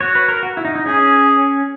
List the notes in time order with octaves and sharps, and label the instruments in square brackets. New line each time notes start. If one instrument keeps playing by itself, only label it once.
[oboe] F#4 [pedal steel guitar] C#5
[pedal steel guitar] B4
A#4
F#4
E4
D#4
D#4
[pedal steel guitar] C#4 [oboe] G#4